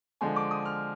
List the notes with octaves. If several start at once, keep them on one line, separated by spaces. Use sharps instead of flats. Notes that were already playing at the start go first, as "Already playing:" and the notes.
D3 F3 G#3 G#5
D6
D#6
F6